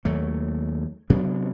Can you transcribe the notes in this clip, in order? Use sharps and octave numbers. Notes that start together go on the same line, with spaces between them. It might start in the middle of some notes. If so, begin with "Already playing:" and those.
D#2 F#3 A3
C3 F#3 B3 D4